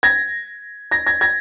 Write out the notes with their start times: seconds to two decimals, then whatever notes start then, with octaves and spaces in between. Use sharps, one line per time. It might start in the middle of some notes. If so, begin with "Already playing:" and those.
0.03 G#6 A#6
0.91 G#6 A#6
1.07 G#6 A#6
1.21 G#6 A#6